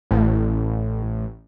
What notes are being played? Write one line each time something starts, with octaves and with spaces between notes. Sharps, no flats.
A1 A2